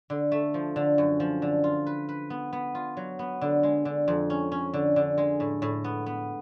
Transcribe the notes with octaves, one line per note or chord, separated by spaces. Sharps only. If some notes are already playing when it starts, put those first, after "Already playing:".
D3
A3
F3
D3
F#2
F3
D3
F4
B4
B4
B3
B3
F4
F#3
B3
D3
G#3
D3
F2
C#4
C#4
D3
D3
G#3
A2
A2
B3
B3